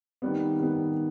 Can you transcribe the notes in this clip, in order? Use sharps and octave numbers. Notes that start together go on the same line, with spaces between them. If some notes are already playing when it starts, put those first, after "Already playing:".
D#3 G3 B3
D#3 G3 B3